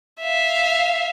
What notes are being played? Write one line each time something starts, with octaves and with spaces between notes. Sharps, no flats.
E5 F5